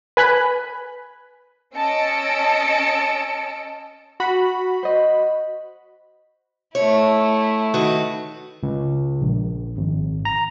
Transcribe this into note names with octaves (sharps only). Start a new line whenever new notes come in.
B4 G#5 B5 F#6
C#4 D#5 A5 E6 C#7 D7
F#4 B5
C5 D#5
A3 E4 C#5
D#3 F#4 B4
C#2
A#1
G#1
A#5